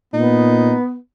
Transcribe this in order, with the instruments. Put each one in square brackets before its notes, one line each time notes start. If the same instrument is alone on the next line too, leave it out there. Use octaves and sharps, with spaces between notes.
[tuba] A#2 [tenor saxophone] B3 [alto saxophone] D#4